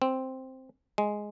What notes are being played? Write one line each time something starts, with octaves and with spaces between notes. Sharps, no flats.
C4
G#3